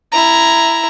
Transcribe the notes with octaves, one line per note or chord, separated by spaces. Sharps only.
E4 A#5